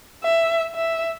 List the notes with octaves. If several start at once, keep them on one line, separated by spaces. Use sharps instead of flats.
E5
E5